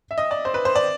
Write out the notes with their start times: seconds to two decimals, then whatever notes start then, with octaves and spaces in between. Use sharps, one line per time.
0.11 E5
0.18 D#5
0.31 D5
0.45 C5
0.54 B4
0.65 C5
0.76 D5